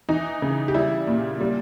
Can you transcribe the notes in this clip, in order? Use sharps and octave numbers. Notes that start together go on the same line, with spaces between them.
E3 D#4
C#3
G4
G3 E4
A#2
G3